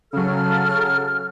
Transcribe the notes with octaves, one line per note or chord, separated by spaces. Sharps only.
C#3 F#3 A4 F6